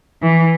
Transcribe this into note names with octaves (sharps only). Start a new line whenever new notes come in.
E3